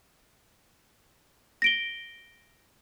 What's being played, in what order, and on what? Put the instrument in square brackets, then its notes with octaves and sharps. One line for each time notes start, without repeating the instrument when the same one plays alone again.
[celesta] A#6 D7 G7